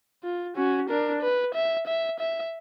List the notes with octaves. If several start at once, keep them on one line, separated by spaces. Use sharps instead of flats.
F4
C#4 F#4
D4 A#4
B4
E5
E5
E5